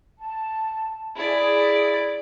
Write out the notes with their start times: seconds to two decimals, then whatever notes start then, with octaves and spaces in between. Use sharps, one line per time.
0.19 A5
1.16 E4 G#4 D5